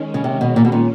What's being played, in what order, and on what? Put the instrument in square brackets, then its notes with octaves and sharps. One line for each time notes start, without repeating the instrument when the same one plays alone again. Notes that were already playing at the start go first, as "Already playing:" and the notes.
Already playing: [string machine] D#3 G#3 C#4
[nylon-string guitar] C#3
C3
B2
A#2
B2
A#2